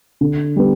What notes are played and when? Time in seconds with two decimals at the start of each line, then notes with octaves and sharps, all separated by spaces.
0.21 D3
0.56 G3 B3